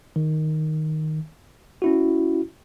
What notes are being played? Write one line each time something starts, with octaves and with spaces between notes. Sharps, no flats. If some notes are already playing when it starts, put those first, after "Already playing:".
D#3
C#4 E4 F#4